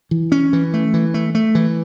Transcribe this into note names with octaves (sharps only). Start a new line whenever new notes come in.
E3
C#4
E3
A3
E3
A3
A3
E3